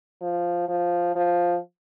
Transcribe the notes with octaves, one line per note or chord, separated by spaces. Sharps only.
F3
F3
F3